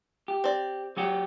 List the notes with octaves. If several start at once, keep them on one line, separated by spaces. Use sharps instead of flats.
G4
C4 D5
F#3 F#4 G4